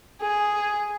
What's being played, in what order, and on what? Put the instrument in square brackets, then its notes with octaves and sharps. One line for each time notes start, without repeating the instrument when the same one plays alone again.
[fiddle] G#4